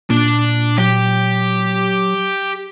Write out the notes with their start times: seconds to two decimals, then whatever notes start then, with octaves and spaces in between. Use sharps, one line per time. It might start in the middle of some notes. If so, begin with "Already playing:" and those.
0.10 A#2 D4
0.78 F#3 G4